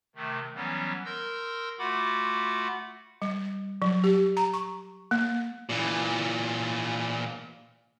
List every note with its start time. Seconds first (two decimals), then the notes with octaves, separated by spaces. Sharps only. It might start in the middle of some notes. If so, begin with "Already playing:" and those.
0.15 C3 D#3 A3
0.55 E3 F#3 G3 B3 C#4
1.05 A#4 C6 E6 G6 A#6
1.79 A3 F4 F#4 F#5 B5 D6
3.22 G3
3.82 F#3
4.04 G4
4.37 A#5
4.54 C#6
5.11 A#3
5.69 A#2 E3